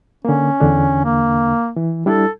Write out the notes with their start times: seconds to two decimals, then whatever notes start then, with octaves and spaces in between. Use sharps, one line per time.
0.25 D3 A#3 C#4
0.60 E2 D3 D4
1.04 A#3
1.76 E3
2.06 G3 D4 E4 A4